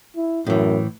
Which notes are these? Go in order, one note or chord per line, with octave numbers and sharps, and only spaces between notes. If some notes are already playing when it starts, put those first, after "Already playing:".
E4
F#2 A2 E3